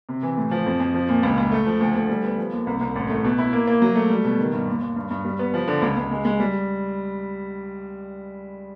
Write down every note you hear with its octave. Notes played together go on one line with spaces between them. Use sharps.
C3
E3
A2
F3
F2
F2
F3
A#2
C#2
C#2
A3
F3
D2
D2
G3
B3
F3
D#2
C2
C2
A1
A3
B2
E4
A#3
A#3
F#3
A3
G3
B2
D#3
G2
D#2
D#2
G2
G2
G3
B3
F3
D3
C#2
C#2
G#3
G#3
G3